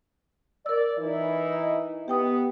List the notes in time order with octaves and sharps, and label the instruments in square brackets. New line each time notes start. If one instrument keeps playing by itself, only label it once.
[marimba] A#4 E6 [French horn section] D5
[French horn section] E3 D#4 E4
[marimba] D#5
[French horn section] B3 [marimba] G4 G5 D#6